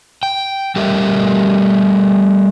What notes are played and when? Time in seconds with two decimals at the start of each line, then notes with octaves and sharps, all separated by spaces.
0.23 G5
0.76 G3 A3 G4 A#4 D#5 E5